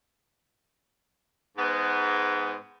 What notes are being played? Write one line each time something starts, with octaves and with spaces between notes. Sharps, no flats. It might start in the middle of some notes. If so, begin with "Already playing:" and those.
G#2 B3